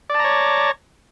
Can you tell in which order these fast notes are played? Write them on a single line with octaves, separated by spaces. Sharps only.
D5 A5 A#5 C#5